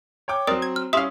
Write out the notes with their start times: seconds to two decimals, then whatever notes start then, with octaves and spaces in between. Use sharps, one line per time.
0.28 C#5 G5 D6
0.47 F#3 C4 A#4 D5 D#6
0.62 G#6
0.76 F6
0.93 G3 C#4 E4 E5 F5 C6 D#6